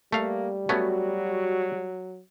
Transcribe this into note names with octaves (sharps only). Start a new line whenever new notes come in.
G3 A3 A#3 F5
F#3 A3 B3 C#4 F#4